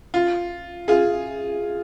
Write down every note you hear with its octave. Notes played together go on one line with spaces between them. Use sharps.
F4
F4 G#4